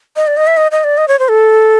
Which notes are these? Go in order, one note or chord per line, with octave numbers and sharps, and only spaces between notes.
D#5
D5
D#5
E5
D#5
D#5
D5
D#5
C#5
C5
A4